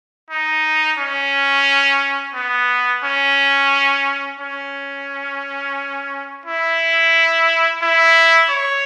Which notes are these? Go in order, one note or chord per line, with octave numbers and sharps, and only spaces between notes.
D#4
C#4
B3
C#4
C#4
E4
E4
C#5